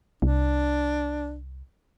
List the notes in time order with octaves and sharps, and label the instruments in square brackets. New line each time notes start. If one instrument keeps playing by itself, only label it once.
[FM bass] C2 [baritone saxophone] D4